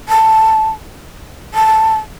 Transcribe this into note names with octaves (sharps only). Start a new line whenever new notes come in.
A5
A5